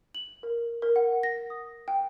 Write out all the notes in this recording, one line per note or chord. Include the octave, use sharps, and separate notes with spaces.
F#7
A#4
A#4
F#5
A#6
D#6
G5